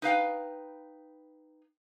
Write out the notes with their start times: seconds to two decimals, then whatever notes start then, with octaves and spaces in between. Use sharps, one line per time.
0.02 D#4 B4 F5 G5